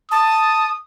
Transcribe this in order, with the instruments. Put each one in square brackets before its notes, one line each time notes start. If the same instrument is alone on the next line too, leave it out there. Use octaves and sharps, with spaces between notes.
[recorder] A5 [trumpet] D#6